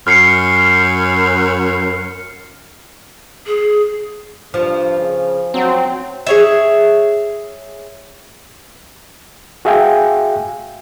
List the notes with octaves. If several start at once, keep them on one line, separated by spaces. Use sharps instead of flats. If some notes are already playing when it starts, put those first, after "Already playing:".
F#2 F6 C7 C#7
G#4
G2 F3
C#3
F#3 C4
G#4 C#5 E5
F#4 G#4 E5 F5 G5 G#5